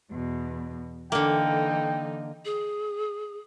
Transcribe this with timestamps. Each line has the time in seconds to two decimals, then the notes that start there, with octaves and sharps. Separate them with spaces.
0.11 E2 B2
1.12 D3 E3 A#3 D#4 A4 G5
2.45 G#4